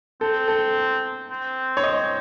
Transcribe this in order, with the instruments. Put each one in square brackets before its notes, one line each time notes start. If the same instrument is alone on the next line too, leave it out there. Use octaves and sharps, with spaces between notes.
[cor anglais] C4 [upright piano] A4
[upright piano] A4
[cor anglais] C4
[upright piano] C#5
D#5